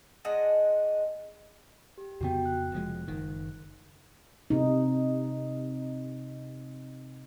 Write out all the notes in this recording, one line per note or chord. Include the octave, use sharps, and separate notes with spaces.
G#3 D4 D#5 F#5
G4
F2 C#3 B3 F#4 G5
F#6
F1 F3 G#3
F#1 D#3
C3 D#4